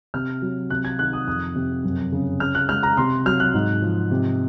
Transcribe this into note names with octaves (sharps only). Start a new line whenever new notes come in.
C3 F6
F#3
C3 F#6
G#6
D#3 F#6
D#6
F2 D#6
C3
F#2
C#3
C#3 F6
F#6
G#3 F6
A#5
C3 C6
F#3 F6
F#6
G#2
F3
C3